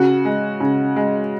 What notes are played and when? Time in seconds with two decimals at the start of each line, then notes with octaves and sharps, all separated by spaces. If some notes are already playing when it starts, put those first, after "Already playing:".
Already playing: C#3 F#4
0.25 G#3
0.60 C#3
0.96 G#3